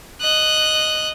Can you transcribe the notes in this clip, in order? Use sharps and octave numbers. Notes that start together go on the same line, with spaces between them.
D#5 F#6